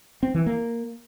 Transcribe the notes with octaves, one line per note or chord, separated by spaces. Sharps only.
C4
E3
A#3